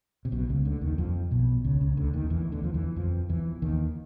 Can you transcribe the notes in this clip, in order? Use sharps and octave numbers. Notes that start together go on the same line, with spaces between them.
C3
B1 B2
C#2 C#3
D2 D3
D#2 D#3
F2 F3
B1 B2
C#2 C#3
C#2 C#3
D2 D3
D#2 D#3
E2 E3
D2 D3
F3
E2 E3
F2 F3
E2 E3
D#2 D#3